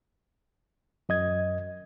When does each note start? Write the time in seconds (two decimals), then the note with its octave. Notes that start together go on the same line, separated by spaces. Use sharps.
1.09 F#2 D#5 G#6